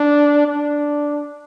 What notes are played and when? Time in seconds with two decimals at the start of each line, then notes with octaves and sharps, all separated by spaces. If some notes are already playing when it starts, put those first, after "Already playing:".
Already playing: D4
0.46 D4